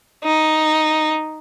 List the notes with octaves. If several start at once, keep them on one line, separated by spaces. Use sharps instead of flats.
D#4